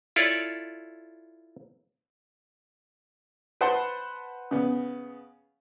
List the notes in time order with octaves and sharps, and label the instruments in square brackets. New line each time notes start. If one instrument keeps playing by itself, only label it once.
[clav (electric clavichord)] E4 F4 A4 C#5 D5
[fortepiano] B4 C5 F#5 A5 B5 C6
C#3 B3